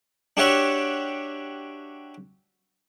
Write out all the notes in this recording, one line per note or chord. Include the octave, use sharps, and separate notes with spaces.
D4 F#4 G4 C#5 E5 F#5